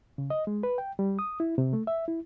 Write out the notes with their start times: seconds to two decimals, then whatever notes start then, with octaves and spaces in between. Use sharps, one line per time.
0.18 C#3
0.30 D#5
0.47 G#3
0.63 B4
0.78 G5
0.99 G3
1.19 D#6
1.40 E4
1.58 C3
1.73 A3
1.87 E5
2.08 E4